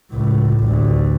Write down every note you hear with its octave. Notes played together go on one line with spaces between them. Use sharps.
C#2 A2
A1 D2